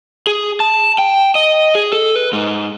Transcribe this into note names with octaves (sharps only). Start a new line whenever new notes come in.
G#4
A5
G5
D#5
G#4
A4
B4
G#2